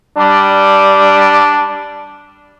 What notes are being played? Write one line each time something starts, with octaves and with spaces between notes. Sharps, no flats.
G3 D4